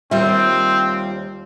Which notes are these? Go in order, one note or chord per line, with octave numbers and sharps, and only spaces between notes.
D#2 G3 C4 F4 E5